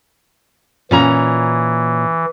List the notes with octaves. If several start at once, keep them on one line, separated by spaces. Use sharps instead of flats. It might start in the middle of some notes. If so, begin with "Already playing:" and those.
A#2 E3 C#4 A#5